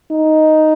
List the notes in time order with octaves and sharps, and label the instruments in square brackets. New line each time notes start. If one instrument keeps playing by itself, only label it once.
[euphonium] D#4